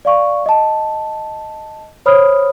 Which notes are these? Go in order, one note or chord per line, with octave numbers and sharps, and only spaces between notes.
D5 F5 C#6
D#5 A5
C5 C#5 B5 D#6 F6